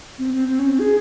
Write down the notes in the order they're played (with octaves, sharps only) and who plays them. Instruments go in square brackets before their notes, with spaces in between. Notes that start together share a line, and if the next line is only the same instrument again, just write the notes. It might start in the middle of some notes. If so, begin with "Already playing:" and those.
[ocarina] C4
C4
C4
C#4
C4
G#4